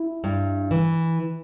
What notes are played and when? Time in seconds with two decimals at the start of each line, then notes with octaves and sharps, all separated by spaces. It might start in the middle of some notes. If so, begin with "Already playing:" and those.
Already playing: E4
0.24 G2
0.71 E3